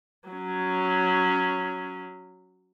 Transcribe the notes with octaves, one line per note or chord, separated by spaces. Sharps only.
F#3 C#4